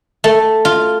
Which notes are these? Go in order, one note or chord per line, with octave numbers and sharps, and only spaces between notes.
A3
F4